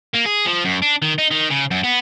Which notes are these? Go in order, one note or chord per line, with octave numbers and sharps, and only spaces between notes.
A#3
G#4
F3
F#2
D4
D#3
D#4
D#3
C#3
F#2
B3